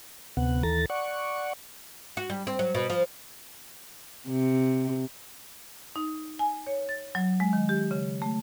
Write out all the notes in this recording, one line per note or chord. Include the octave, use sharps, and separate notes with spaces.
D2 C3 B3 F#5
D#2 E3 A4 A#5 A6
D5 F#5 C#6
F#4
G3
C4
F#3
B2
F3
C3
D#4
G#5
C#5
A6
F#3
G#3
D#3
G4
C#3
A3